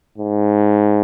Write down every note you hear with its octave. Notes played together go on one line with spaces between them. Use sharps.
G#2